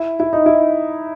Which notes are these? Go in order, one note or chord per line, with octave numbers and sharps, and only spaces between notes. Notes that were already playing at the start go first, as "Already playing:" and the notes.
Already playing: E4
E4
D#4
E4